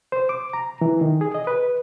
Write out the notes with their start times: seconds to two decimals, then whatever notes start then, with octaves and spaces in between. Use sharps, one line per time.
0.12 C5
0.29 D6
0.53 A#5
0.81 E3
1.01 D#3
1.21 G#4
1.34 D#5
1.47 B4